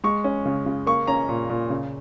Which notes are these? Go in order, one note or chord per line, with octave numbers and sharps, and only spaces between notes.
G#3 C#6
C#4
C#3
C#3
A#3 C#6
C#4 A#5
A#2
A#2
C#3